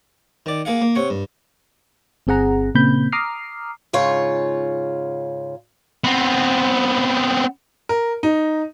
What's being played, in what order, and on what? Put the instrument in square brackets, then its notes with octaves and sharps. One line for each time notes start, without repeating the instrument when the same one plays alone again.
[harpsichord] D#3 D5
A#3 G#4 F5 F#5
A#3
C3 C#5 F#5
G2
[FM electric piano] G1 C4 G#4 F#5 A#5
A#2 C#3 A#3 C4 B5 G6
A#5 D6 D#6 F6 C7
[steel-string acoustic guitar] G#2 C#3 F4 C#5
[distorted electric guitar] B3 C4
[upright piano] A#4
D#4